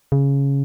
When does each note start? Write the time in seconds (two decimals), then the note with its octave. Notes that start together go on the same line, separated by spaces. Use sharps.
0.12 C#3